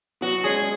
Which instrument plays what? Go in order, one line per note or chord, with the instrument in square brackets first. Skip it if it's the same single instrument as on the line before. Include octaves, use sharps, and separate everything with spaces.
[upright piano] F#3 B3 [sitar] F#4
[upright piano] G#3 C#4 [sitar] G#4
[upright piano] C#4